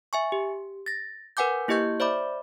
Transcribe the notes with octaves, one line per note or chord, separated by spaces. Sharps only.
E5 G#5 C#6
G4
A6 A#6
A#4 B4 F#5 G#5 D6 G6
A#3 E4 G4 D#5 C#6 G6
C5 D5 E5 B5 D6